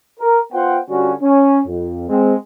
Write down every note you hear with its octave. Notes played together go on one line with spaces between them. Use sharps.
A#4
B3 F4 C5 F#5 G5
D3 G3 C#4 F4 F#4
C#4
F2
G#3 C4